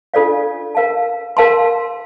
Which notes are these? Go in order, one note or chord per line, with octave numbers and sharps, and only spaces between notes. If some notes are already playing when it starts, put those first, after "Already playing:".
D4 F4 A4 D5 F5
A#4 F5 A5
A#4 F5 A5 C6